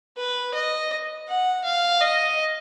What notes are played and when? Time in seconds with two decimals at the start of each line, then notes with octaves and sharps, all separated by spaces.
0.17 B4
0.54 D#5
1.28 F#5
1.64 F5
2.01 D#5